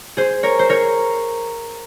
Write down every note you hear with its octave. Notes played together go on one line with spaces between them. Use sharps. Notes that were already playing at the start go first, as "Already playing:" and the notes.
G#4 C5
A#4 C#5
C5
A#4 C#5